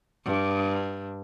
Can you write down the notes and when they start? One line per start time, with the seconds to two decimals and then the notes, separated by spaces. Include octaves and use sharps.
0.25 G2